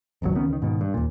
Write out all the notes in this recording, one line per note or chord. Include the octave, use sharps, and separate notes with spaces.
D#1 G#1 C#2 F#3
C#2 D#3 B3 C#4
C#2 D#3
G#2 B2 D#3
G2
D#2 A#2